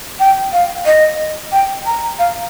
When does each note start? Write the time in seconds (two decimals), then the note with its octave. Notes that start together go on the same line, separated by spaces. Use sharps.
0.20 G5
0.53 F5
0.86 D#5
1.52 G5
1.86 A#5
2.19 F5